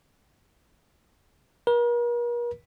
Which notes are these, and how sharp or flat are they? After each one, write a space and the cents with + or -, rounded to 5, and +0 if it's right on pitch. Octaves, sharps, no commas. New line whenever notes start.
A#4 +45